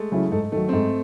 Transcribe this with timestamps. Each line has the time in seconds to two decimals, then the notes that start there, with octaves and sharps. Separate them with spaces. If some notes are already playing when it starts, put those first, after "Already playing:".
Already playing: G#3 A3
0.12 C#3 F#3 C#4 E4
0.32 G#2 A3
0.52 D#3 F#3 A3
0.69 C4
0.73 G#2 A3